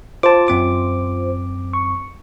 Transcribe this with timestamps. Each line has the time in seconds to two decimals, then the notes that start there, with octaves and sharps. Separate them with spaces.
0.23 F4 C5 A5 D6
0.48 F#2 C4 D6
1.73 C#6